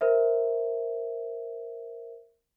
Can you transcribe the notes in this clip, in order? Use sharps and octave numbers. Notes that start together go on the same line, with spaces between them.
A#4 C5 E5